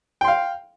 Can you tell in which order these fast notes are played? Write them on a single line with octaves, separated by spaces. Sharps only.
G5 C6 F5